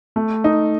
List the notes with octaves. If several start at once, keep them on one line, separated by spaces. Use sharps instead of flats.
A3
D#4